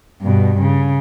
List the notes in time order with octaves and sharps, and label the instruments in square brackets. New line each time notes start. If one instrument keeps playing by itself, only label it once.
[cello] G2 B2
C#3